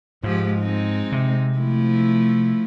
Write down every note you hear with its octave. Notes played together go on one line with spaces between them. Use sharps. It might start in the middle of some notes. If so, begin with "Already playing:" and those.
G#2 F3 G#3 G4
G#3 C4 D#4
C3
F3 A3 E4